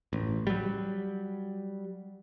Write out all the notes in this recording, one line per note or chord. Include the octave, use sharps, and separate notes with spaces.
A1
F#3 G3